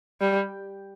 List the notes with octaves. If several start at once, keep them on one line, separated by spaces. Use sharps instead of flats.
G3